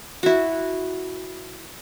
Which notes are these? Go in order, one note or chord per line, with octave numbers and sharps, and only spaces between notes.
E4 F#4